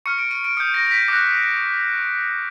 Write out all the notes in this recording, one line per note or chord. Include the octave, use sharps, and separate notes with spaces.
C#6 F6 C#7
D7
D#7
D7
D#6 G6 C#7
A#6
A#6
B6
D6 F#6 A#6